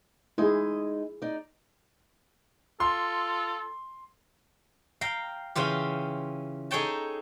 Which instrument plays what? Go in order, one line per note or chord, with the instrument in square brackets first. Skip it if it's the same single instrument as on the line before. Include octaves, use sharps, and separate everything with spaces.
[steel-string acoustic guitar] G#3 D#4 D#5 [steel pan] E4 G#4
[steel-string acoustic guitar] D#4 D5
[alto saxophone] F4 [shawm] A4 [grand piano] C6
[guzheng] F5 G5 A#5
C#3 E3 F4 G4
D#4 G#4 A4 C#5 G5 A5